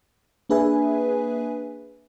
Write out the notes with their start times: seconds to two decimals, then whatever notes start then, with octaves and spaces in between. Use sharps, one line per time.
0.50 A#3 D4 G#4 B4 E5 G#5